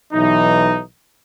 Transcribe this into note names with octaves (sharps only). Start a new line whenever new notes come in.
B1 E3 D#4